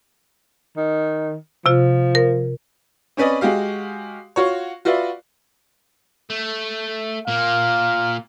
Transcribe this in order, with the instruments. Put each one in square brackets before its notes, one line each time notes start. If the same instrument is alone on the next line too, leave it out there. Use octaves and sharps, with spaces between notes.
[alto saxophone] D#3
[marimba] C3 F4 [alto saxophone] F3
[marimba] A#4
[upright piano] C4 C#4 B4 D5 D#5
G#3 F#4 G4 F5
F4 F#4 C#5
F4 F#4 B4 D5 E5
[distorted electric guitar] A3
[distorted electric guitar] A#2 A#3 [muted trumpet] F5